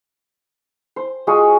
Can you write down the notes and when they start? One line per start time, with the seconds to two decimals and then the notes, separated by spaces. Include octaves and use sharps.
0.96 C5
1.27 G#3 F4 F#4 G#4